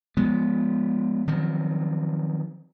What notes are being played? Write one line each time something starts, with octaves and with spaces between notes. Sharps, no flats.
F3 G#3 B3
D#3 F3 F#3 C4